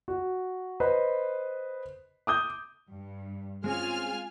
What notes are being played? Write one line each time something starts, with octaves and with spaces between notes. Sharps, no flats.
F#4
B4 C5 D#5
D6 D#6 G6
G2
G#3 C4 C#4 F4 G#4 G#5 F6